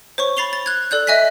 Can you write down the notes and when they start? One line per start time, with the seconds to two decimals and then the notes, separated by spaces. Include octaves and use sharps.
0.18 C5 C#5 C#6
0.37 B5 A6 C7 F7 G7
0.53 A6
0.66 F#6 G#6
0.91 A4 D5 F#6 G6
1.07 D#5 E5 G#5 F#6 B6